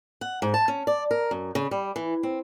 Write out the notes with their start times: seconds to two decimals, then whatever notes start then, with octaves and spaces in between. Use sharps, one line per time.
0.21 F#5
0.42 G#2
0.54 A5
0.68 C#4
0.87 D5
1.11 A#4
1.31 F#2
1.55 C#3
1.71 G3
1.96 E3
2.23 C4